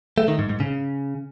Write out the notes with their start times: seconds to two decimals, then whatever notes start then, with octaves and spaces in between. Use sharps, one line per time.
0.18 A3
0.28 D#3
0.39 G#2
0.49 G#2
0.60 C#3